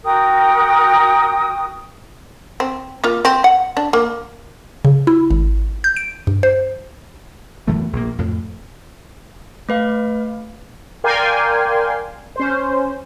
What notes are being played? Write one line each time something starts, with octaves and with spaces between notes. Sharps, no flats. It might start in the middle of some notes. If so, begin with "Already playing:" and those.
F#4 A#4 G5 D#6
C4
A#3 F4
C4
F#5
D4
A#3
C#3
E4
G#1
G6
D7
G2
C5
F#2 E3 A3 B3
A#1 A#3
F2 A2
A3 B4 F5
A#4 D5 F5 G5 G#5 C6
C#4 C5